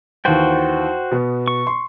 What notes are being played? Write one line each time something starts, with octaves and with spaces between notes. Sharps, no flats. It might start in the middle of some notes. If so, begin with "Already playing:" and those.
D#2 E3 F#4 C5 G5
B2 B3
C#6
C6